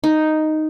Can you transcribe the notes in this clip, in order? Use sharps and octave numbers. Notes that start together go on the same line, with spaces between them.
D#4